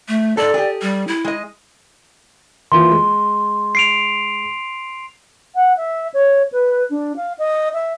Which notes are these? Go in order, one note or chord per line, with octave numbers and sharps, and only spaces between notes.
A3
G#2 A4 D5
G4 G#4
G3
E4
G#3 D#5
E3 A#3 F4 C6
G#3
C7 D7 F7
F#5
E5
C#5
B4
D4
F5
D#5
E5